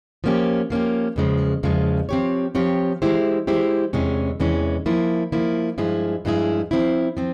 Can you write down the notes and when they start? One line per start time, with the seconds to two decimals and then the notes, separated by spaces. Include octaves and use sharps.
0.24 F3 A#3 C#4 G4
0.70 F3 A#3 C#4 G4
1.16 E2 C#3 F3 G#3
1.63 E2 C#3 F3 G#3
2.09 F3 C4 G4 C#5
2.55 F3 C4 G4 C#5
3.02 E3 G#3 E4 G4 C5
3.47 E3 G#3 E4 G4 C5
3.93 E2 C3 E3 G#3 C#4
4.40 E2 C3 E3 G#3 C#4
4.86 F3 A#3 E4
5.32 F3 A#3 E4
5.78 G2 F3 G#3 E4 G#4
6.25 G2 F3 G#3 E4 G#4
6.71 F3 C4 E4
7.17 F3 C4